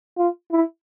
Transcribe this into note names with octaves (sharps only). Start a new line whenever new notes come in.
F4
E4